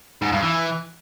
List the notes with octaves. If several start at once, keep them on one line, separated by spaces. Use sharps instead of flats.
G#2
G2
E3